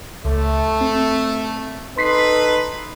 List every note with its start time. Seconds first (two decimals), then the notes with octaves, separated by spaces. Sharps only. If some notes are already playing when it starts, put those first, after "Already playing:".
0.25 C#2 A3
0.81 C4
1.98 D#4 A4 B4 C6 B6 C7